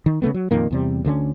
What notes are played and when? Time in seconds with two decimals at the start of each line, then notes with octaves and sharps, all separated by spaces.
0.06 D#3
0.22 C#3 E3 A3 B3
0.34 F#3
0.51 F2 A#2 D#3 A#3
0.71 E2 C3 G3
1.05 D2 D3 A3 C#4